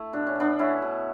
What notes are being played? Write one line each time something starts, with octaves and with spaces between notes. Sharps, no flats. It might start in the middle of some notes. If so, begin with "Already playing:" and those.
Already playing: A3 E4
B2 D4
C#4
B2 B3 D4
A3 C#4 E4
B2